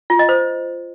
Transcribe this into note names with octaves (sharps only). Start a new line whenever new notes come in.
F4
D#5
C5